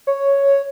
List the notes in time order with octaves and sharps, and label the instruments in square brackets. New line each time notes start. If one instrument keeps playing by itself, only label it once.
[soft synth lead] C#5